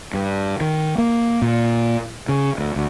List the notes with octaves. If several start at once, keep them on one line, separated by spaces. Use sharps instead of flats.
G2
D#3
A#3
A#2
C#3
D2
D2